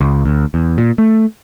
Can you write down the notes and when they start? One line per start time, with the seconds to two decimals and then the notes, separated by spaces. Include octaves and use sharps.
0.01 C#2
0.26 D2
0.54 E2
0.78 A#2
0.98 A3